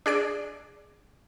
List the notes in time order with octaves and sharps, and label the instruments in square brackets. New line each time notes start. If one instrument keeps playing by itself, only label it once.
[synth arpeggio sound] D4 G#4 D5 D7